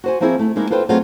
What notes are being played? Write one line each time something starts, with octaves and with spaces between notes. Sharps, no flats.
F#4 C5 G#5
F3 A#3 C4 E4 G#4
A3
G#3 A#3 D#4 E4
F4 A4 B4 C5 G5
F#3 A3 B3 C4 F4 G#4